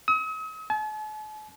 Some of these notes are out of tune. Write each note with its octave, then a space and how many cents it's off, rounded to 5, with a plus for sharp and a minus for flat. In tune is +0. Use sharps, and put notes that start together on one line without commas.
D#6 +45
A5 -45